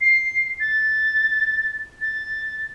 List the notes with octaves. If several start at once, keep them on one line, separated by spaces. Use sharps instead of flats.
C7
A6
A6